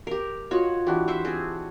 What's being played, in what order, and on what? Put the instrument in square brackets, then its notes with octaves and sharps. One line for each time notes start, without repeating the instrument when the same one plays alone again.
[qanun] G4 A#4
[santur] F4 D#5 [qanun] F#4 C#5
[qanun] E3 [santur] D4 F#4 G4
[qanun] C5 E5
C4 G#4